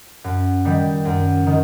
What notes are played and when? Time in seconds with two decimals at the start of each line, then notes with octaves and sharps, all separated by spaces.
0.24 F#2
0.65 D#3 G3
1.05 F#2
1.47 D#3